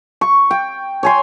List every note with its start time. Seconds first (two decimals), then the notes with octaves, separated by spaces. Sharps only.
0.21 C#6
0.51 G5
1.03 C#5 G#5 C6